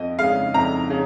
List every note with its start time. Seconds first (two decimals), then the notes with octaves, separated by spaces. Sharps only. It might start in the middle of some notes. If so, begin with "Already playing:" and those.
Already playing: F2 D#5
0.19 C#3 G#3 F5
0.54 F2 A#5
0.90 C#3